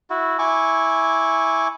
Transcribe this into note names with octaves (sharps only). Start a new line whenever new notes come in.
E4 F#4
E4 G#5 C#6 D6